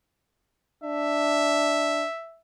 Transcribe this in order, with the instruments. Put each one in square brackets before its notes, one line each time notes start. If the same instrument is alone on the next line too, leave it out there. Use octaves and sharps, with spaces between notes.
[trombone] D4 [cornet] E5